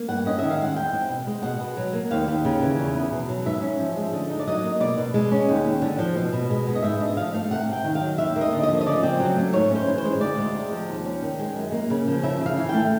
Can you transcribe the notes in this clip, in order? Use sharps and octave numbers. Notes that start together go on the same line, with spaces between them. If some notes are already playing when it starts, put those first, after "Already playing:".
Already playing: A#3
G2 F#5
C#4 D#5
D#3 E5
F5
G#3
F#5
E2 G5
C4
B2
G#3
B2 F#5
B2
F#3
A#3
D#2 F5
D#2
C#3
E3
E2
B3
B2
F#3
G#2 E5
C#4
F3
G#3
D3 D#5
D#4
D5
F#3 D#5
A#3
B2 D5
B2
G#3
C#4
D#2
D#2
D3
F3
B2
B2
G#3
B3
D#5
G#2 E5
D4 D#5
F3 F5
A3 F5
C3 F#5
C3 G5
D#3
F5
F#3
D#2 E5
A#3
D#5
D3
F3 D#5
D#5
C#3 D5
C4
F#3
A3
G#2 C#5
C#4
C5
E3
C5
G#3
D2 D5
G#3
C3
F3
D#2
C#4
D#3
G#3
F#2
A#3
C#3
F3
C#3 E5
C#3 F5
E3
A3 G5